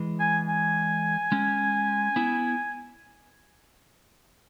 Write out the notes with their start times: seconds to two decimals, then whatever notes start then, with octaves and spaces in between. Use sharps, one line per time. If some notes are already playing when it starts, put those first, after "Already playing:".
Already playing: E3 G#3
0.20 G#5
0.48 G#5
1.32 G#3 C#4
2.16 B3 E4